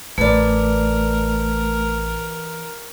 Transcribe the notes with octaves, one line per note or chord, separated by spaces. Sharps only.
A1 E3 A3 A#4 D5